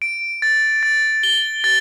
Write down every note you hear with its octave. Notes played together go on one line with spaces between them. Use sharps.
D7
A6
A6
G7
A6